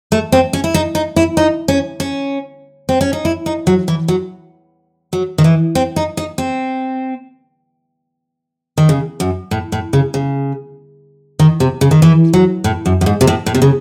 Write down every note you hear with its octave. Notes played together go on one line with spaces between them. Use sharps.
A3
C4
C#4
E4
D#4
D#4
E4
D#4
C#4
C#4
C4
C#4
D#4
E4
D#4
F#3
E3
F#3
F#3
D#3
E3
C4
D#4
D#4
C4
D#3
C#3
F#2
A2
A2
C#3
C#3
D#3
C3
C#3
D#3
E3
F#3
A2
F#2
F#2
G#2
C3
A2
A2
C3
C#3